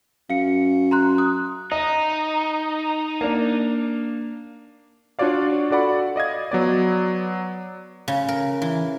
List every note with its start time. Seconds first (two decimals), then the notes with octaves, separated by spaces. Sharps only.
0.30 F#2 F5 C#7
0.91 A#5 C6 F#6
1.18 D#6 F#6
1.72 D#4 D#5
3.21 A#3 D4
5.19 D4 F4 F#4 C#5 D5 F5
5.71 F#4 A4 D5 F#5 B5
6.16 D5 D#5 F5 G#6
6.52 F#3 B3 D5
8.08 C#3
8.28 A#4
8.62 E3